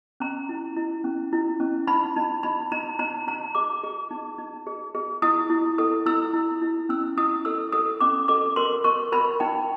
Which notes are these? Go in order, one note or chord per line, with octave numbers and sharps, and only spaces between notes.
C#4 A#5
E4
E4
C#4
E4
C#4
D#4 B5
D#4
D#4 B5
D#4 A#5
D#4 A#5
D#4 A#5
G#4 D6
G#4
D#4
D#4
G#4
G#4
E4 D#6
E4
A4 D#6
E4 E6
E4
E4
C#4 E6
E4 D#6
A4 E6
A4 D#6
C#4 D6
A4 D6
A#4 C6
A#4 C#6
A#4 B5
D#4 G5